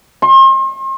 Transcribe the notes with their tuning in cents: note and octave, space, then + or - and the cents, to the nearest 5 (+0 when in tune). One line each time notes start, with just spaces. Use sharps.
C6 +40